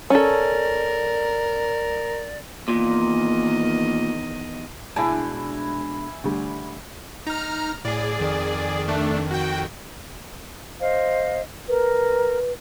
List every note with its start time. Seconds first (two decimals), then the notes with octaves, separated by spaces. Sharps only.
0.10 C#4 A4 A#4 D5
2.68 E2 A#2 D#3 D#5
4.96 B2 G#3 D4 E4 G#5 A5
6.24 D2 G3
7.27 D#4 A#5 F6
7.85 A2 G#4 D5
8.20 F2 D#3
8.88 A3 D4
9.31 F#4 G5
10.80 C5 D#5 F5
11.68 A#4 B4